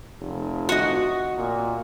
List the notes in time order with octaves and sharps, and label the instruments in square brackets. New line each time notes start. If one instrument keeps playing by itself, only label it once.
[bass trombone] F1
[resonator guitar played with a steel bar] F#4 D#5
[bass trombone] A#2